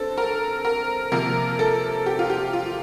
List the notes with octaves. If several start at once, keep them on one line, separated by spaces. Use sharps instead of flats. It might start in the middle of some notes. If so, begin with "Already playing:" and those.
Already playing: D3 C4 A4
A#4
A#4
C3 F3 A#3 A#4
A4
G4
F4
G4
F4